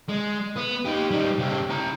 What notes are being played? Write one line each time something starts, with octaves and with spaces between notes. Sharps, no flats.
G#3
B3
D#4 G4
G3 D#4
C#3 G4
E4 A#5